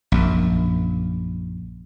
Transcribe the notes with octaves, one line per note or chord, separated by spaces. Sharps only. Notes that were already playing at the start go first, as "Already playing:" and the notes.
A#1 F#2